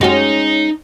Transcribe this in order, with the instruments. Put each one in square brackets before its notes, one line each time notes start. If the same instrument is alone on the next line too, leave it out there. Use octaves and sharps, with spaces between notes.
[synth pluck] F#2 F#4 G4 [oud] G#3 C#4 [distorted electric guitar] D#4